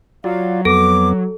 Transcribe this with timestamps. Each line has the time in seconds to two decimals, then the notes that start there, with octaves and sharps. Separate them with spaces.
0.24 F#3 F4 D5 F5
0.65 F2 B3 A4 D6